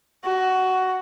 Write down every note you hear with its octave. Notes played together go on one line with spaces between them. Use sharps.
F#4